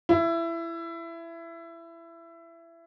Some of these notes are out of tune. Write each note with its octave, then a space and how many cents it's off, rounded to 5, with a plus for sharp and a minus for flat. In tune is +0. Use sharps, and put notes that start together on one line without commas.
E4 +20